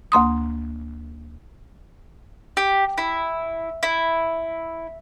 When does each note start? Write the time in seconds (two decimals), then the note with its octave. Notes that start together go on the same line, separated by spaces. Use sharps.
0.12 D2 A#3 C6 D#6
2.57 G4
2.98 E4
3.83 E4